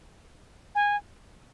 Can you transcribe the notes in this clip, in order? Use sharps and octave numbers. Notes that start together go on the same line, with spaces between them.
G#5